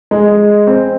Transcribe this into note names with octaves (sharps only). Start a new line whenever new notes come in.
G#3
C4